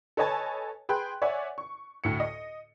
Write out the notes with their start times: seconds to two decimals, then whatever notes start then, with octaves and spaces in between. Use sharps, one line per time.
0.17 A4 B4 C#5 D#5 G#5 A5
0.89 G#4 B4 G5 C6 F#6
1.22 C#5 D5 E5 F#5 G#5
1.58 C#6
2.04 D2 A2 C#7
2.20 D#5